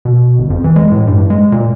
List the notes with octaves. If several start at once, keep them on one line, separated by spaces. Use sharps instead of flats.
B2
G1
F2
E3
G#3
A2
G2
G#3
A#2